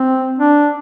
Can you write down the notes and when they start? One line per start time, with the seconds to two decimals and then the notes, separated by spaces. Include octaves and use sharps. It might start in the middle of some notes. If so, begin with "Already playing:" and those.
Already playing: C4
0.39 D4